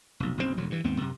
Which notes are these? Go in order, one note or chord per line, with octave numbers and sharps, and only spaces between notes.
F1 B1
F#1 B1 C3 C4
E1 D2 F#3
G2 E3
D#2 G#2 B3 C4
F#2 C3